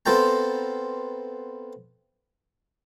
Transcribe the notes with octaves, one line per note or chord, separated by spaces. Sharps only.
B3 C4 F4 A4 G5 A#5